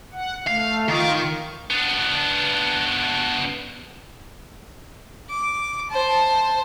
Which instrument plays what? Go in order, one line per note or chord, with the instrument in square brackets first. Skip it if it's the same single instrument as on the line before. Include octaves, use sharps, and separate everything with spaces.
[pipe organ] F#5
[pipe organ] A3 [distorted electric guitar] F5
[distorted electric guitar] D#3 [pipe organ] F4 C#6 D6
[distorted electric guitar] B3 D4
[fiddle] D6
C5 A5